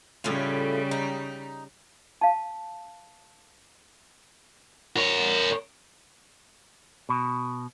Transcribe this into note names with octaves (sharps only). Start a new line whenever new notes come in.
A2 C#3 G3 E4 F4
D#4
F5 A5
A#4 C#5
B2